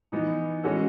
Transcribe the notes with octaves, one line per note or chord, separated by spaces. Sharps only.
E3 B3 D#4
E3 G#3 C#4 F#4 A4